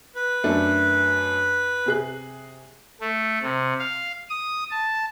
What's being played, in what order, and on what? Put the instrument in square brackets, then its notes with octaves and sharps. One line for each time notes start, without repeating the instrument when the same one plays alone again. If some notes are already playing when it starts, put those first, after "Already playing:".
[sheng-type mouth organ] B4
[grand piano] F#2 A3 D4
C3 G#4 F#6
[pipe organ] A3
C3
F5
D#6
A5